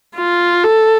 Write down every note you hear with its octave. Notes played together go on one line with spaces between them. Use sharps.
F4
A4